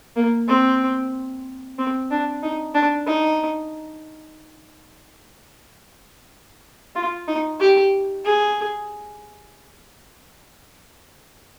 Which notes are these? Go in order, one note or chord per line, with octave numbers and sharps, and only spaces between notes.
A#3
C4
C4
D4
D#4
D4
D#4
F4
D#4
G4
G#4